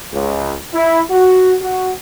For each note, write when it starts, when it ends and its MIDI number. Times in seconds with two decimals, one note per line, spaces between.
0.13 0.55 37
0.74 1.01 64
1.10 1.56 66
1.62 1.92 66